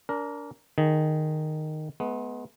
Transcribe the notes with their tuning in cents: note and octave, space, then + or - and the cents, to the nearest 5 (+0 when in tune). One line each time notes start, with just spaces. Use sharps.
D4 -25 A#4 +5
D#3 -10 G#4 +0
G#3 +45 B3 +0